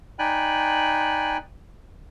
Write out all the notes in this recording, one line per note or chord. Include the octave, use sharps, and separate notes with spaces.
D#4 D5 G5 G#5 B5 F#6